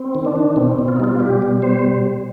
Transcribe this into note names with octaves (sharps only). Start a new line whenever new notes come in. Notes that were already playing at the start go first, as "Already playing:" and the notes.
Already playing: C4
D#3
D4
D#3
B2 C4
B2
F4
D#4
G3 F4
G3 G4
B2
G3 C5